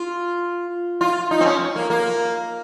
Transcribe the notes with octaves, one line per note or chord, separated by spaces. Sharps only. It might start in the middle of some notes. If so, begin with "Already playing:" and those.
Already playing: F4
F4
D#4
C4
C#4
A#3
A#3